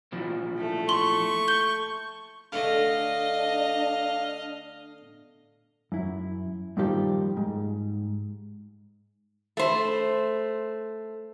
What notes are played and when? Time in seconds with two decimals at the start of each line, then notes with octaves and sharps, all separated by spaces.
0.12 A#2 E3 F3
0.58 A3
0.89 C6 C#6 F#7
1.48 G6 G7
2.52 D3 A3 D4 D#5 F5
5.92 F#2 E4
6.77 G2 A#2 D#3 F3 G3 G4
7.37 G#2
9.57 A3 C5